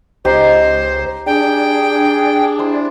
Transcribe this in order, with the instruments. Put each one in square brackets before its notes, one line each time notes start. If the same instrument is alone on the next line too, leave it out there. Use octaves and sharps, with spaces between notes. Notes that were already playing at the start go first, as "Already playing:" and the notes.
[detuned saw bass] C#2 [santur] D#4 G4 [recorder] C5
[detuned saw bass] D4 [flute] G#4 [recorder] G5
[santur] E4 C5